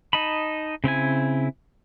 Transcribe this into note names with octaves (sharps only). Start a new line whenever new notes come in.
D#4 D#5 A5 B5
C#3 C4 E4 G#5